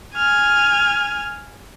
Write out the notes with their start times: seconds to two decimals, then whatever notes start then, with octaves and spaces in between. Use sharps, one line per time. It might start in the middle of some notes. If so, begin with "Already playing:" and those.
0.16 G#5 F6